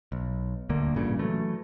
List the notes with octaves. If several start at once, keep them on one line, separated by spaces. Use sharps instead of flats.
B1
D#1 D2 D3 A#3
A1 G2 A#2 C#3
E3 F#3 A3